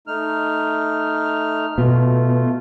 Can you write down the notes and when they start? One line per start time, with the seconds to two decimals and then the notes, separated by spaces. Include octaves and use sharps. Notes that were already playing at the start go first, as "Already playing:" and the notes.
0.07 A3 D#4 F6
1.78 B2 A3 F4